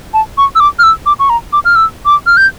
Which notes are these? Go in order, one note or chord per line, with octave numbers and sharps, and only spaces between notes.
A5
C#6
E6
D6
F6
E6
D6
C#6
A#5
D6
F6
E6
D6
F6
G6